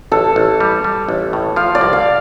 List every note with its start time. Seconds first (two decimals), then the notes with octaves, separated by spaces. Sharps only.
0.12 A1 A4
0.36 A1
0.60 G3
0.84 G3
1.09 A1
1.33 A2
1.56 F3 F5
1.75 D5
1.81 C2
1.93 F5